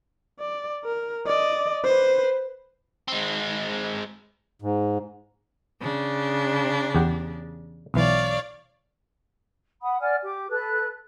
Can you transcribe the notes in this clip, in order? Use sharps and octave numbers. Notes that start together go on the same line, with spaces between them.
D5
A#4
D5 D#5
B4 C5
G#3 C4
G#2
C#3 D4
E2 G4 F#5
B1 E3 C#5 D5 F5
F#5 B5 D#6
D5 F#5 G#5 F6
G4 D6
A4 B4 F#6